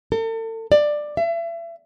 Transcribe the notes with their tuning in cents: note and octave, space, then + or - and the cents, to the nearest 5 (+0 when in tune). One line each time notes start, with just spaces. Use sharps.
A4 +40
D5 +15
E5 +35